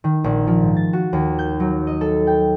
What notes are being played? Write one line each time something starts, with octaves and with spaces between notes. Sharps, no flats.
D#3
A#1
F3
G#2
A6
F#4
D#2
G6
F#3
D#5
A4
G5